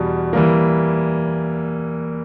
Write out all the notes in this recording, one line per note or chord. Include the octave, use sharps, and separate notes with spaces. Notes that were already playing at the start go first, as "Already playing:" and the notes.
Already playing: E2 B2 G3
E3 G3 A#3